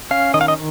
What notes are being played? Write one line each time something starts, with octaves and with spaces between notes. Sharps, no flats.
C#4 F5
D#3 D#5
F5
D#5